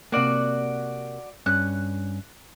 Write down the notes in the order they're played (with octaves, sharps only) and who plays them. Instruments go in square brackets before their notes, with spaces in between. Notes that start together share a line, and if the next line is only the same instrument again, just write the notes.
[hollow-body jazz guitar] C3 A#3 [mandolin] F#4 D5
[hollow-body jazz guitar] G2 C#4 [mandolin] F#6